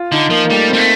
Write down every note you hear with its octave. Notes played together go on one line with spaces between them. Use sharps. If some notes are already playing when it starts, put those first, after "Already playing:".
Already playing: F4
D3 D#4
F3 A#3
A#3
G3 A3
G3 C4
A3